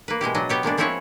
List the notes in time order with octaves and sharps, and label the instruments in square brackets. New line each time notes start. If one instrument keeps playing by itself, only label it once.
[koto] A#3 B4
B2 G#3 E4 G4
F#3 D4 D#5
B3 G4 C#5
G#3 A#3 B3 D4
F3 C4 C#4 E4 F#4 C#5